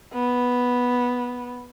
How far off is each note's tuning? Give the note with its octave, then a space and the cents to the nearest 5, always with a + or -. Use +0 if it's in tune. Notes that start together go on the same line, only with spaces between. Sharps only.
B3 -5